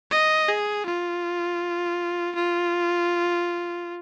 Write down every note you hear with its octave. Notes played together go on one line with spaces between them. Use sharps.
D#5
G#4
F4
F4